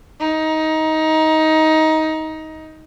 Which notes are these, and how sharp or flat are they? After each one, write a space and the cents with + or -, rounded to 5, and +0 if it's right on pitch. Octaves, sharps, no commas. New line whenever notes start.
D#4 +20